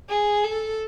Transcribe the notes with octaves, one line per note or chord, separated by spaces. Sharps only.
G#4
A4